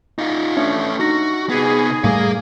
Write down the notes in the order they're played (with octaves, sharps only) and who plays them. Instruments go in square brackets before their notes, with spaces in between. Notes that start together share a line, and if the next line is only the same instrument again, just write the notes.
[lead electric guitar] D#4 F4
[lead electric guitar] A3 C#4 [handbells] D4 E5
[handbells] D#4 A#6 [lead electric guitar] F#4
[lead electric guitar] C3 B3 [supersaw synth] G#4
[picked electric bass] A2 G3 A3 [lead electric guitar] A#4 F5